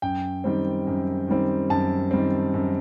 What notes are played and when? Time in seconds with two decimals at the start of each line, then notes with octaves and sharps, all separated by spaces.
0.02 F#2 G5
0.44 D#3 G3 C4
0.87 F#2
1.28 D#3 G3 C4
1.70 F#2 A5
2.11 D#3 G3 C4
2.54 F#2